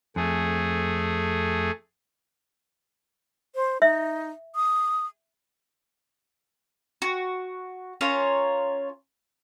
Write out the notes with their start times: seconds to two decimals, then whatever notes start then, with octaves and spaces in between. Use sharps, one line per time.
0.16 F2 A3 G#4
3.55 C5
3.82 D#4 E5
4.56 D#6
7.02 F#4
8.01 C#4 F4 A#4 C#5